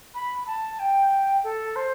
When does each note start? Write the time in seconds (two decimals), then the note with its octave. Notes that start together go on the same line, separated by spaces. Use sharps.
0.14 B5
0.47 A5
0.79 G5
1.44 A4
1.76 C5